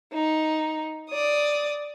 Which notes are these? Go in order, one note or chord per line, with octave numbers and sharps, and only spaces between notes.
D#4
D5 D#6